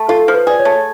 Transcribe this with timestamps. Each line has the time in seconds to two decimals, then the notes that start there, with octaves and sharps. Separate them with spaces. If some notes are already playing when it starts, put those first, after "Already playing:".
Already playing: A3
0.09 F4 A4
0.28 F3
0.34 B4
0.47 G#4 D5
0.59 C#5
0.65 A3